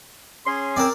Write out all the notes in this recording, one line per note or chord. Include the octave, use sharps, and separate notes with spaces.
C#4 G#4 C6
C4 A#4 D5